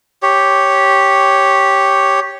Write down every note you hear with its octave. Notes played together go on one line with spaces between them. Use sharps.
G4 C#5